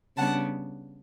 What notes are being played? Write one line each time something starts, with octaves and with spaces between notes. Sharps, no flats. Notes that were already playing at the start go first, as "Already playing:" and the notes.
C#3 G3 B3 D4 F#5 A5